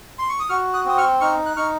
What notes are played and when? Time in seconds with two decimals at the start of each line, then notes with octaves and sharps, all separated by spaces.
0.19 C6
0.29 C#6
0.40 D#6
0.49 F#4 C#6 F6
0.73 D#6 F#6
0.85 C4 D#6
0.98 C#6 F6
1.21 D#4 C#6 F6
1.46 F#6
1.56 D#4 C#6 F6